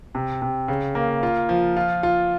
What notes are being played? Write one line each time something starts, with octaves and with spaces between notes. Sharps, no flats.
C3
C3
C#3
A#3
F4
F3
F4
F4